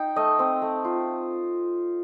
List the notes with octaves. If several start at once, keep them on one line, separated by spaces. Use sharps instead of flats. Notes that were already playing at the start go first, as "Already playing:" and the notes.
Already playing: D#4 G5
A3 D#5
C4
A3
F4